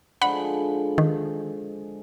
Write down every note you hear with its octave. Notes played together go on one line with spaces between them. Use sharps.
D3 F3 G#3 F#5 B5
D#3